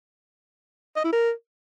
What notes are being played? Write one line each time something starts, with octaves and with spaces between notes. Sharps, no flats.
D#5
E4
A#4